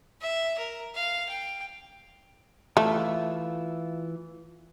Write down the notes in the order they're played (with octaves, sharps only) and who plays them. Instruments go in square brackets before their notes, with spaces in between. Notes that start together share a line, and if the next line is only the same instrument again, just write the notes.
[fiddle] E5
A#4
F5
G5
[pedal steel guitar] E3 F4 E5 [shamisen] A3